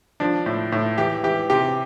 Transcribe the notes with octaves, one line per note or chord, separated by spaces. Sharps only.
F3 D4
A2
A2
E3 G4
E3 G4
C3 G4